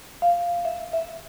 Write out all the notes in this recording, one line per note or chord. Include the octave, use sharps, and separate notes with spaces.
F5
E5
E5